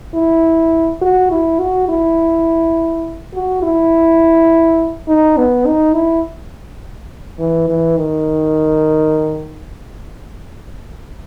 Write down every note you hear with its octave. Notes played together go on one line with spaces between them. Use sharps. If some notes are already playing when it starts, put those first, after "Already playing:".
E4
F#4
E4
F#4
E4
F#4
E4
D#4
B3
D#4
E4
E3
E3
D#3